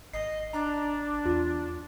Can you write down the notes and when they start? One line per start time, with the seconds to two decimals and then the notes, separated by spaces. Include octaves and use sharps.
0.13 G#1 D#5 C7
0.53 D4 A#5
1.26 E2 F4